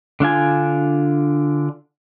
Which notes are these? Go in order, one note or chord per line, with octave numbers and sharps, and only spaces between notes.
D3 D4 F4 G#5